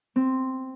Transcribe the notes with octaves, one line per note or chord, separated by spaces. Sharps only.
C4